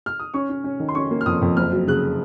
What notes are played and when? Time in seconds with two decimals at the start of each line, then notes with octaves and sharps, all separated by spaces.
0.06 F6
0.19 D#6
0.34 C#4 C#6
0.49 C#4
0.64 C#4
0.80 D#3
0.89 C6
0.95 C#4 C#6
1.11 A#3
1.21 F6
1.26 F2 D#6
1.42 F2
1.57 F#1 F6
1.72 F#3
1.87 C#3 F#6